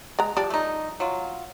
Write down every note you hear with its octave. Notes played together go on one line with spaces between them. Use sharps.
G#3 A#5
F3 G3 D4
A3 D#4
F#3 F4